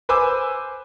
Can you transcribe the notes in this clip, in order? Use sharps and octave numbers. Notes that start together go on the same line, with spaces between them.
B4 C5 G#5 D6 E6